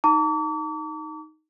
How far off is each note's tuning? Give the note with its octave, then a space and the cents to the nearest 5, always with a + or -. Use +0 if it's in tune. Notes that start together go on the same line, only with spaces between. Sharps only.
D#4 +5 A#5 -45 D6 -40